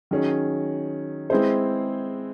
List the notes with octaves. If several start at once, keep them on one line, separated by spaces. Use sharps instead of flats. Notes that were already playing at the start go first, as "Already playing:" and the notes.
D#3 F#3 C#4 G#4
G#3 C4 E4 G#4 C5